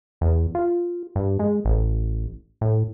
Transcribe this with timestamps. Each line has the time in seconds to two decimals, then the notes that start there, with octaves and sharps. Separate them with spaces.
0.21 E2
0.55 F4
1.15 G2
1.39 G#3
1.65 A1
2.61 A2